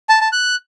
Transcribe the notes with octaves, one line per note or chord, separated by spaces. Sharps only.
A5
A5
F#6